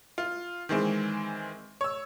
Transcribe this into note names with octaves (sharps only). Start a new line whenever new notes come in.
F4
D#3 E3 G#3 C4
C#5 E6